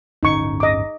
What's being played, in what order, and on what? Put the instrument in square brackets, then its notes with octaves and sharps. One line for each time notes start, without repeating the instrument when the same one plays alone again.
[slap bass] D1 G1 C#4 [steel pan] D#4 C#6
[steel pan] D#5 D6